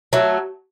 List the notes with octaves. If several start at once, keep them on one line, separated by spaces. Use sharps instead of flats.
F#3 A3